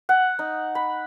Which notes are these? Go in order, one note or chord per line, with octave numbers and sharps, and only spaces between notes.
F#5
D#4
B5